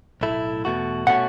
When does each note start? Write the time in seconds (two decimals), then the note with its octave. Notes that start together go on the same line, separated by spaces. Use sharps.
0.21 B1 A2 A3 E4
0.65 E2 B2 A3 F#4
1.07 B2 A3 C#4 F#4 F#5